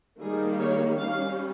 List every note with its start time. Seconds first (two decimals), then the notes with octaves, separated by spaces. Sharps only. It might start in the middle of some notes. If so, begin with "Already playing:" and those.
0.20 D#3 G3 A#3 G#4
0.60 C#5
0.99 G3 C#4 F5